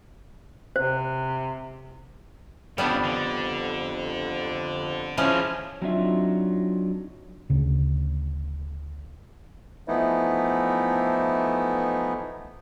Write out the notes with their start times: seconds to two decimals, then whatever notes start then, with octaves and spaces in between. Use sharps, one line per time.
0.76 C3 C5
2.78 F2 C#3 E3 G3 B3 D4
3.04 D3
5.18 E3 F3 G#3 C#4 D#4 E4
5.82 F#3 C4 D4 D#4 F4 E5
7.50 D2 C#3
9.88 E3 F3 A3 B3 D#4 E4